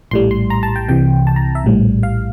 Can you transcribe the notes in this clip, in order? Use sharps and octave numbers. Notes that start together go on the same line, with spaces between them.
A#1 A2 G3 C6
C6
A#5
A5
G5
C2 C3 E3 G5
A5
A#5
E5
A#1 A2 G3
F5